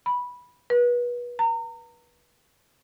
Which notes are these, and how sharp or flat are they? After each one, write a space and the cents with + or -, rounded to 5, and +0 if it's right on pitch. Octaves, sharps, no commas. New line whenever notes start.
B5 -10
B4 -30
A#5 -30